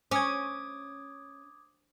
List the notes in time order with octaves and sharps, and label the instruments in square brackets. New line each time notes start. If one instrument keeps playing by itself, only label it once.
[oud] C#4 [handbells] D6 D#6 G#6